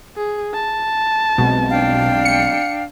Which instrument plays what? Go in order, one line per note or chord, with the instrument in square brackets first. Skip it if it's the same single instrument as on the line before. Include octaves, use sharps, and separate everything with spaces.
[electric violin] G#4
A5
[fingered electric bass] B1 G#3 C4 [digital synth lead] B2
[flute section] D4 F5 G5
[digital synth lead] C#7